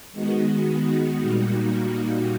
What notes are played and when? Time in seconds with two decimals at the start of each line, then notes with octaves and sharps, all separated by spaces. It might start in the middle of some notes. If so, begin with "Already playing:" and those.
0.13 D#3 G#3 B3 D#4 F#4
1.20 A#2 G3 A#3 D#4 F#4